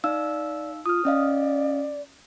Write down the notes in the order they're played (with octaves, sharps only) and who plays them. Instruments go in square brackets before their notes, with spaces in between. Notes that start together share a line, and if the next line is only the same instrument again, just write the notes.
[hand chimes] D#4 F5 E6 [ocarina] D5
[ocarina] F4 [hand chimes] D#6 F6
[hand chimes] C#4 D#5 F5 [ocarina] D5